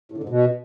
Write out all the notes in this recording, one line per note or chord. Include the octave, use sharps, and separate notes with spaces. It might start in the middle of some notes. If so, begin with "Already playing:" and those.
A2
D3
G#2
B2